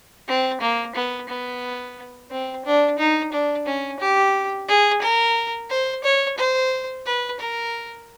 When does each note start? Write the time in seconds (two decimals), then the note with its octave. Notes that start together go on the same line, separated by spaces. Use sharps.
0.28 C4
0.61 A#3
0.96 B3
1.29 B3
2.31 C4
2.65 D4
2.98 D#4
3.32 D4
3.66 C#4
4.00 G4
4.68 G#4
5.02 A#4
5.70 C5
6.04 C#5
6.38 C5
7.06 B4
7.40 A#4